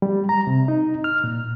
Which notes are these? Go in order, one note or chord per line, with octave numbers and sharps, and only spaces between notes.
G3
A#5
C3
D#4
F6
A#2